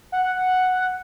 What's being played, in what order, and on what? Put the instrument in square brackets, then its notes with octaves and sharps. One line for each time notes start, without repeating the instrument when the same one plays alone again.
[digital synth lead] F#5